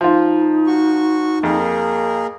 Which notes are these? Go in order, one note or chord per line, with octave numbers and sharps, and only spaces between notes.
F3 D#4 F4
F#4 C#6
F2 A#3 G#4 A#4